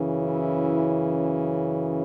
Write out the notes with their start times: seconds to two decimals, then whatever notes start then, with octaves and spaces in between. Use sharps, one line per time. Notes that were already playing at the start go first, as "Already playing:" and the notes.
Already playing: F#2 C#3 E3
0.23 E4